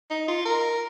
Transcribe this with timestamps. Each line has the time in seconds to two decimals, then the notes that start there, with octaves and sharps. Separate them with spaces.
0.10 D#4
0.28 F4
0.45 A#4